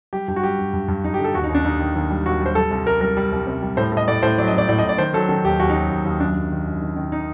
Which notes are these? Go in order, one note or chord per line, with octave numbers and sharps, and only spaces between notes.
G3 G4
G2 G4
F#4
G3 G4
G2
G2
G2
G2 D#4
G4
D3
A4
D#2 F#4
D#4
D#2
D4
D#2 D#4
D#3
D#2
G3
D#2 F#4
G3 C5
G3 A4
C2
G3 A#4
G3 A#4
G3
C2
C3
G3
A2 C5
A2
D#5
A2 D5
A2 C5
F#3 D5
D#5
A2 D5
A2 D5
D#5
A2
D5
D#3 C5
F#3 A4
D#3 A4
D#2 G4
D#2 F#4
D#4
F#3
D#2
D#2
F#2 D4
F#2
D#3
F#2
D#3
D#3
D#4